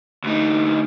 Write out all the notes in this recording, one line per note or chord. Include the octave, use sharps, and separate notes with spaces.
D2 D#4